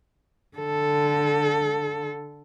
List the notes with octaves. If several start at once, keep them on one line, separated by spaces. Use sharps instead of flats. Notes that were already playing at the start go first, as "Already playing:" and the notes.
D3 A4